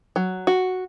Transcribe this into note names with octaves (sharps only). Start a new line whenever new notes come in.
F#3
F#4